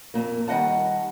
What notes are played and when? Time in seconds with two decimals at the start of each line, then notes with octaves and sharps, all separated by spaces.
0.14 F2 A#2 A#3
0.47 D#3 G3 D#5 F#5 A5